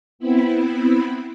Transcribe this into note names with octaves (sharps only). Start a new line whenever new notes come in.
B3 C4 E4 B5